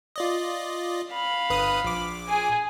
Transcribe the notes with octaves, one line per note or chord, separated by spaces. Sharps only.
F4 D5 D#5
F5 B5
G1 B4 D#6
A#1 D6
G#4 G#5